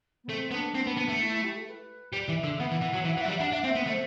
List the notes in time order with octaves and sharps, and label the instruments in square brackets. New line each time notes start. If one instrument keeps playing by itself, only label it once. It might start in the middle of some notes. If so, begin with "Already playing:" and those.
[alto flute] B3
[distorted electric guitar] A3 [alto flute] C4
[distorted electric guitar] B3 [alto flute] D4
[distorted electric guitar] C4
B3
B3
A3
[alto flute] E4
E4
G4
A4
B4
[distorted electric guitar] G3 [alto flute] D5
[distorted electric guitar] E3
[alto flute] E5
[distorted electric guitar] D3
[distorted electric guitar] B2 [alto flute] F#5
[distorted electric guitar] E3
E3
F#3
[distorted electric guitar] E3 [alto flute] E5
[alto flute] F#5
[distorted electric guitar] E3
[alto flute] E5
[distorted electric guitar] F#3
[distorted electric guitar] G3 [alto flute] F#5
[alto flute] E5
[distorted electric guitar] D4
[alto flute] F#5
[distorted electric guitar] D4 [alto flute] E5
[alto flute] F#5
[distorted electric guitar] C4
[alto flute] E5
[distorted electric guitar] B3
A3
[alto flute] C5